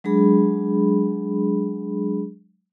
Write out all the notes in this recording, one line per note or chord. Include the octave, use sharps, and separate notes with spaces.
F#3 G#3 D4 G#4 B5